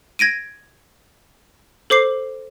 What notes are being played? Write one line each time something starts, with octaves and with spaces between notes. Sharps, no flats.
G#6 A#6 D7 D#7
A4 C5 D6 C7